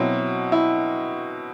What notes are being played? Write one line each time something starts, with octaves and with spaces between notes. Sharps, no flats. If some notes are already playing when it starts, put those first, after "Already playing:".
Already playing: B2 F#3 C4 E4
E4